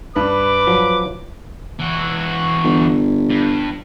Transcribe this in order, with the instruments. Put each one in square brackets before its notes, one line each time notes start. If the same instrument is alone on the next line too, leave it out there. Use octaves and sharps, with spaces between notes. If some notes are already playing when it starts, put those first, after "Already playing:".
[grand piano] G2 [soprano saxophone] B4 [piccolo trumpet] D6
[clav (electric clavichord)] F3 F#3
[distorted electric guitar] E3 F#4
[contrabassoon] G1
[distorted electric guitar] G2